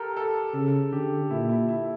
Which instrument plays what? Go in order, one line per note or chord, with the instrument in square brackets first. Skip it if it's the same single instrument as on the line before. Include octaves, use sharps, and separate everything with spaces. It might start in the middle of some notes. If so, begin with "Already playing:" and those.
Already playing: [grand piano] G4 A4 A#4
A4
[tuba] C#3 [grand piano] A4
[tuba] D3 [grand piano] G4
[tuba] A#2 [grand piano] E4
[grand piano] E4
E4